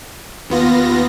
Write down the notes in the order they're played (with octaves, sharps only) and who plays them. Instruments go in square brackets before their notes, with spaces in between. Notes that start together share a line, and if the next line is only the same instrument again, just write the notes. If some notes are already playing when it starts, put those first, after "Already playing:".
[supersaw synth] D#2 B3 F4 A#6